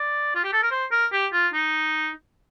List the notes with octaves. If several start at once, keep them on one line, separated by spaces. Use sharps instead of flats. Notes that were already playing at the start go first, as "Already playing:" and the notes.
Already playing: D5
F4
G4
A4
A#4
C5
A#4
G4
F4
D#4